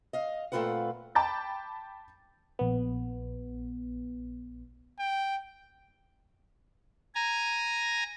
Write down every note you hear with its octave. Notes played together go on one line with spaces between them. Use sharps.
D#5 F5
A#2 A3 C4 F4 B4 F#5
G5 A5 B5 D6 G6 A6
A#1 B3
G5
G#5 A#5